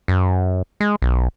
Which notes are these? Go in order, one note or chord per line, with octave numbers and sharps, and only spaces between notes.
F#2
G#3
B1